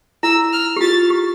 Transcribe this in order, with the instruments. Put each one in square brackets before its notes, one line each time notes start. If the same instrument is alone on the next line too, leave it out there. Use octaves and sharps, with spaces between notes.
[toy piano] E4 [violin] E6
[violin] F6
[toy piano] G4
[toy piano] F4 [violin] A6
[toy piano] G4